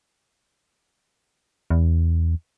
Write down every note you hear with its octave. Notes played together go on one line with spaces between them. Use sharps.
E2